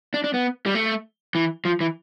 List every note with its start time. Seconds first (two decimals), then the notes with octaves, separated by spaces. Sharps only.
0.14 D4
0.24 D4
0.34 B3
0.66 G3
0.75 A3
1.35 E3
1.65 F3
1.81 E3